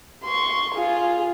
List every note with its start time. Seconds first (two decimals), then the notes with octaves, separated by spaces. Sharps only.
0.24 C6 C#6
0.75 F4 G#4